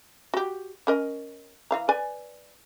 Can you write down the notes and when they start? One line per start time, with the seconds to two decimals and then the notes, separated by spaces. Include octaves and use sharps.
0.34 F#4 G4
0.87 C#4 A#4 D#5
1.71 E3 F5 A#5
1.89 B4 D5 G#5